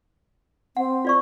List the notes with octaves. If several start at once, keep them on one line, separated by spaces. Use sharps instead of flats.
C4 F#5
F4 D5 C#6